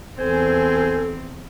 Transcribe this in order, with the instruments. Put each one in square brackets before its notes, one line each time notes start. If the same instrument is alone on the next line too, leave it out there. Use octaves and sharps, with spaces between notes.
[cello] E2 C4 [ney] A4 [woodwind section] C5 G#5